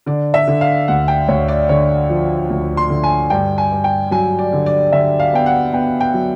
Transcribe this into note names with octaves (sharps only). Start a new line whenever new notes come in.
D3 D5
E5
D3
F5
D2 F#5
G5
D2 C#5
D5
D3 C#5
F3
D2
C6
D3
G#5
G2 G5
G#5
G2
G5
F#3 G#5
D5
D3
D5
D3 E5
F5
B3 G5
F#5
B3 G5
G5
F#3